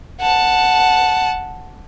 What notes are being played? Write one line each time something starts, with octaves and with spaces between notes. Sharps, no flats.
F#5 A5